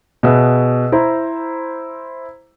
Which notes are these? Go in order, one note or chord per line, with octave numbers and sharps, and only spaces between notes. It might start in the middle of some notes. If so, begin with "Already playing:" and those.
B2 G#4 B4 E5 E6
E4 C5 A#5